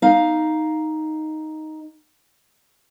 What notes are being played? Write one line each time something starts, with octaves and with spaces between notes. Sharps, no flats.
D#4 F5